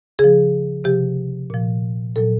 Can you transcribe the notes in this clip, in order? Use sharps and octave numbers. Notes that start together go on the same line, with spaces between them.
C#3 F3 G#4
C3 F3 G4
A#2 F3
A#2 F#3 A4